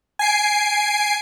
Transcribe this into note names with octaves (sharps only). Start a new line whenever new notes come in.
G#5 C7 D7